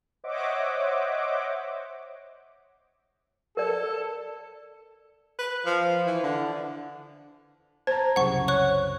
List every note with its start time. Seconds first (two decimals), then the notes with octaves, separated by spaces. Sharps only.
0.24 C5 C#5 D#5 E5 F#5 D6
3.57 A4 A#4 D5
5.39 B4
5.66 F3
6.06 E3
6.23 D3
7.87 C5 A5 A#5
8.16 C2 F#2 C#3 F#5 C#6
8.48 C#5 C#6 F#6